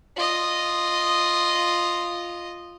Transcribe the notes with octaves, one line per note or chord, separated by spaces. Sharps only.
F4 D#5